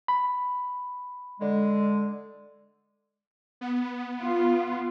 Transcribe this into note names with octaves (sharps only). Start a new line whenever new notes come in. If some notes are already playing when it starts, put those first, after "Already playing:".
B5
D3 G#3
B3
F4